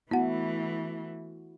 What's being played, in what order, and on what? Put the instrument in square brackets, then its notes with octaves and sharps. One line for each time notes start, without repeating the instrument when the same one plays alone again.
[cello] E3 A3 [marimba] B3 F#5 [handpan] E4 F#4